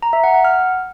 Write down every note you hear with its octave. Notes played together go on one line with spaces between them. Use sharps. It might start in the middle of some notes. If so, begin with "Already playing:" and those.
A#5
E5
F#5
F#5
F6